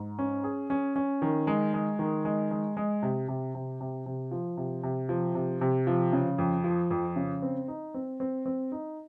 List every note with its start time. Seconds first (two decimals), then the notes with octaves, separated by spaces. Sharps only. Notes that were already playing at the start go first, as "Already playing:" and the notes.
Already playing: G#2
0.19 C#4
0.44 G#4
0.70 C#4
0.96 C#4
1.22 D#3
1.47 G#3
1.74 G#3
1.99 D#3
2.25 G#3
2.51 G#3
2.77 G#3
3.03 C3
3.28 C3
3.55 C3
3.81 C3
4.06 C3
4.31 F3
4.57 C3
4.83 C3
5.09 F3
5.35 C3
5.61 C3
5.87 F3
6.13 C#3
6.38 F2
6.64 F3
6.91 F2
7.16 C#3
7.42 C4
7.68 D#4
7.94 C4
8.20 C4
8.46 C4
8.72 D#4